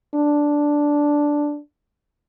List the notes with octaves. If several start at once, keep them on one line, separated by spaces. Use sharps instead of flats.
D4